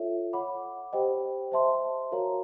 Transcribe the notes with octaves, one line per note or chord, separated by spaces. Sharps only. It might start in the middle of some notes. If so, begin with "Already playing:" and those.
Already playing: F4 A4 C#5 E5
C#5 F#5 B5 D6
G4 C5 D#5 G5
C5 E5 A5 C6
F#4 A#4 C#5 F5 A#5